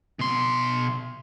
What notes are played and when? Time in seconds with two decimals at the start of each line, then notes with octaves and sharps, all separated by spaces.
0.19 B2 C6